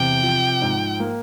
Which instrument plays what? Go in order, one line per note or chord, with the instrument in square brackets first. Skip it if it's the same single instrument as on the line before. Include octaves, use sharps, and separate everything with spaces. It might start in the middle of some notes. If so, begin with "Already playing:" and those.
Already playing: [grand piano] E2 C3 [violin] G5
[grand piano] F3
G#2
A#3